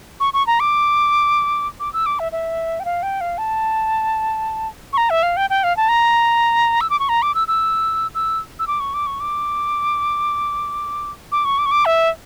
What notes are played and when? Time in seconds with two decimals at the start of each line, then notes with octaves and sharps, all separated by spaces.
0.20 C#6
0.33 C#6
0.47 A#5
0.60 D6
1.80 D6
1.93 E6
2.06 D6
2.19 E5
2.32 E5
2.80 G5
2.85 F5
3.03 G5
3.21 F5
3.38 A5
4.93 C#6
4.97 A#5
5.10 E5
5.23 F5
5.37 G5
5.50 G5
5.64 F5
5.77 A5
5.89 A#5
6.81 E6
6.90 D6
7.00 C#6
7.09 A#5
7.22 D6
7.35 E6
7.48 E6
8.15 E6
8.59 E6
8.67 D6
8.80 C#6
8.94 D6
9.07 C#6
9.20 D6
11.32 D6
11.45 C#6
11.59 D6
11.66 C#6
11.71 D6
11.85 E5